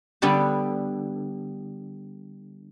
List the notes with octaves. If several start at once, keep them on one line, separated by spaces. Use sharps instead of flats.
D3 G3 B3 D4 G4